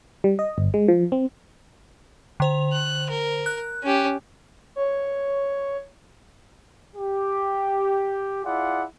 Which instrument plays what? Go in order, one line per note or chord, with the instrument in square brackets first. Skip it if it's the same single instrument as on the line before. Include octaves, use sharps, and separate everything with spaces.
[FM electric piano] G3
D#5
G1
G#3
F3
C4
[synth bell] D3 C5 F7
[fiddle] F#6
A#4
[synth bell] F#6
[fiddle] C#4 G4
[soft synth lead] C#5
[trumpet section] G4
E4 F4 G#4 D5 F#5